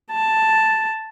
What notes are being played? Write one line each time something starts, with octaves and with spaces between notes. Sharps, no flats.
A5